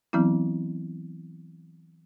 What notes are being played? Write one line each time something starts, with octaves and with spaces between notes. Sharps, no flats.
E3 F#3 B3 C4 E4